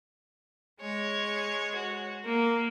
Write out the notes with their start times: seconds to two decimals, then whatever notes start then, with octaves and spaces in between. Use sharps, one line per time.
0.81 G#3 C#5
1.75 F#4
2.25 A#3